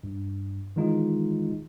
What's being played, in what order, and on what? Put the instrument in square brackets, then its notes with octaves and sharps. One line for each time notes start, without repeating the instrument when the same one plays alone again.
[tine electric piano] G2
D#3 E3 G#3 D#4 F4